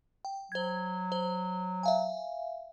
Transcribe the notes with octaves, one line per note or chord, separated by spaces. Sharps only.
G5
F#3 C5 G#6
C5
E5 F5 G#5